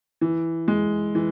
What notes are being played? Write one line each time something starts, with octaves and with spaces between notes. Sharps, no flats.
E3
G#3
E3